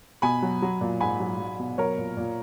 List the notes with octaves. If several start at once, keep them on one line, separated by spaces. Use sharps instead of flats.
B2 G#5 B5
F#3
F#3
A#2
G#2 G#5 B5
F#3
F#3
B2
F#3 A#4 C#5
A#2
A#2